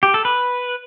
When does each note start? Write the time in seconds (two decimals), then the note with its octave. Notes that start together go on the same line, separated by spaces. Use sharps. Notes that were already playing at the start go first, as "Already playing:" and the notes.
0.03 G4
0.14 A4
0.25 B4